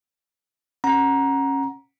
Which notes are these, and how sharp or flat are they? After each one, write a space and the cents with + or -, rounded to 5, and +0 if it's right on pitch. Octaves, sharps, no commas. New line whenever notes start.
C#4 -20 F#5 +0 A#5 +15